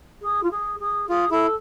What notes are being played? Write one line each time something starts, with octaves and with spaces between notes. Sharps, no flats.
G#4
F4
G#4
G#4
F4 G#4
E4 A4